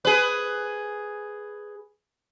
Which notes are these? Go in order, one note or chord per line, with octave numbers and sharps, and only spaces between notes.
G#4 B4